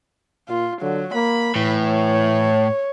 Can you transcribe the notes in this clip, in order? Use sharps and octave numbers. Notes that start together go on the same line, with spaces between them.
A#2 F4
D3 F#3
A#3 B5
A2 E3
C#5